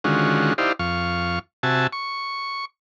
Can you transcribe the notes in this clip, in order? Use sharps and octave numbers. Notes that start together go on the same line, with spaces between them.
D3 D#3 G#3 C#4 F4 F#4
D#4 E4 G4 C5 D5 F5
F2 F5 C#6
C3 F#4 E5 G#5 A5
C#6